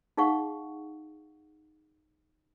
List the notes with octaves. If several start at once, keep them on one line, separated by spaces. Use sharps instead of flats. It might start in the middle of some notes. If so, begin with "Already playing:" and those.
D#4 G#4 F5 F#5 C#6